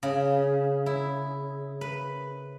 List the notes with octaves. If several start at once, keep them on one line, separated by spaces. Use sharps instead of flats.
C#3
E4
B4